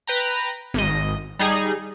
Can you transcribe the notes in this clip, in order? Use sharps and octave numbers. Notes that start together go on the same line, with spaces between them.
B4 G5 A#5
G#1 D#5
G3 D#4 G#4